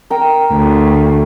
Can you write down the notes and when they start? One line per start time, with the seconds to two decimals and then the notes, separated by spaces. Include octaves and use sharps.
0.10 A#4 G5
0.52 D2